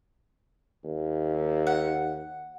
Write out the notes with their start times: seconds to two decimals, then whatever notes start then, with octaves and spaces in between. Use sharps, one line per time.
0.84 D#2
1.67 F#5